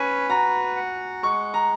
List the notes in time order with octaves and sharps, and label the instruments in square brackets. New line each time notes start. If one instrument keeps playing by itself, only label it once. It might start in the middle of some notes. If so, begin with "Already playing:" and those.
Already playing: [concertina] C#4 B4 [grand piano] G#5
[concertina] F#4 [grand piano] A#5
[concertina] F#5
[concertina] G#3 [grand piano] C#6
[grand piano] A#5